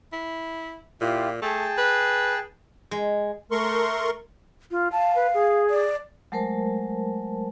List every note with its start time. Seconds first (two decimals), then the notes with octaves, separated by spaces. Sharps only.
0.13 E4
1.01 A#2 E4 F4 G4
1.42 A3 G#4 G5 A5
1.78 B4
2.91 G#3
3.51 A3 A#4 C6 C#6
4.71 F4
4.92 F5 A5
5.16 B4
5.34 G#4
5.70 D5
6.32 F#3 G#3 A3 A#4 C5 A5